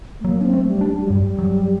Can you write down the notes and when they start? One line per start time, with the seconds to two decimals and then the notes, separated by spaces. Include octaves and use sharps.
0.20 A3
0.24 F#3 A#3
0.41 D4
0.45 C4
0.53 A3
0.67 G3
0.81 D4
0.88 G3
1.02 F#3
1.09 G2 G3
1.39 F#3